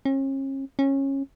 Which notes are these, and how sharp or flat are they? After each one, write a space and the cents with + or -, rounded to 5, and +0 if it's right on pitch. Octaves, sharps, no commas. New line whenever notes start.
C#4 -40
C#4 -20